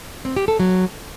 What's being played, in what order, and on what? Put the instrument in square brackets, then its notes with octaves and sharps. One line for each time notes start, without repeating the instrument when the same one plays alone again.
[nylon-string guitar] C4
G4
A4
F#3